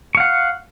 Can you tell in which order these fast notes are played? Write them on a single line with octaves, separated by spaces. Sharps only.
C#6 F5 F#5